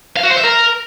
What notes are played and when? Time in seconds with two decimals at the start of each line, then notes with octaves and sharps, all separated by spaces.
0.16 F5
0.23 F#4
0.30 C5
0.37 E5
0.43 A#4